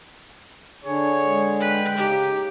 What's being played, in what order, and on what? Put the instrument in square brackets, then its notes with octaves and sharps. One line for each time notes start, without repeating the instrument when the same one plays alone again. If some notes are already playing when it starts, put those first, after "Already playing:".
[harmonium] D3 G#4 [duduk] D4 [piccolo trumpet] C#5
[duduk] G#3
[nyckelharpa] B4 [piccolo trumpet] G5
[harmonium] C#3 D#4 [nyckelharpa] G4